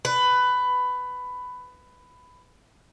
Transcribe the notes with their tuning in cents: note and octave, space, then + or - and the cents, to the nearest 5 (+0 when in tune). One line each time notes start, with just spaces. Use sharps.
B4 +15